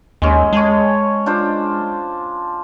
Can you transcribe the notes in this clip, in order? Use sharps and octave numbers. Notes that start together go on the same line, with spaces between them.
D#2 G#3 C#4
G#3 C#5 A5
D4 F4 C5